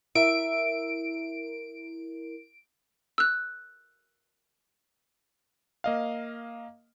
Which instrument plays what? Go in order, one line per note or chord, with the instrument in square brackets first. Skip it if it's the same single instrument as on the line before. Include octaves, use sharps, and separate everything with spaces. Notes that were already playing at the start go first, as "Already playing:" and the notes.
[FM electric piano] E4 A#4 [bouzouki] E5 [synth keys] D7
[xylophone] E6 F#6
[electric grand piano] A#3 D#5 F5